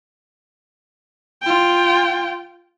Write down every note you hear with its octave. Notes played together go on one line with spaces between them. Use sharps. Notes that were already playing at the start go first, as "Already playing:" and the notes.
F4 G5